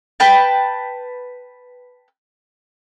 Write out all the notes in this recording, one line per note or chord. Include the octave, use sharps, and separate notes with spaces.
B4 G5 A5